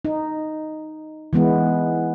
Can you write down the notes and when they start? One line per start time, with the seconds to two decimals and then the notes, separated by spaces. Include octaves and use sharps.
0.05 D#4
1.33 E3 G#3 B3